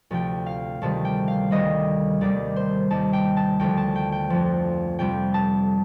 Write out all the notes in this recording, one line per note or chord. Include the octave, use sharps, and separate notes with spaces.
D2 C3 F3 G5
F5
D2 C3 D#3 G3 A5
G5
F5
D2 C3 D#3 G3 D#5
D#2 D#3 G3 D5
C5
D#2 D#3 G3 A5
G5
A5
D2 D3 F3 G5
A5
G5
G5
F2 D3 F3
F2 C3 G3 G5
A5